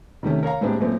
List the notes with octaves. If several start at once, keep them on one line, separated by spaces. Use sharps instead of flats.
C3 D#3 A3 C#4
A#4 C#5 F5 A#5
A2 G#3 A#3 C4 D4 G4
F#2 A#2 A3 C4